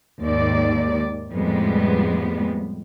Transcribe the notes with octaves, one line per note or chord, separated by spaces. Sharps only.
D#2 G#2 D#3 D5
F2 A2 G3 G#3 B3